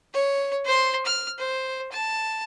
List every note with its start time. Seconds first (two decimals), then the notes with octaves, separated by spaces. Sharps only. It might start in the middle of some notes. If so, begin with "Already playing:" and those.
0.14 C#5
0.65 C5 C6
1.05 F6
1.38 C5
1.92 A5